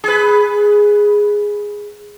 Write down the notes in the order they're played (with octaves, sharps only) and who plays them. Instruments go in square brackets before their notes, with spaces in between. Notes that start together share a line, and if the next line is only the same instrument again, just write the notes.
[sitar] G#4 B4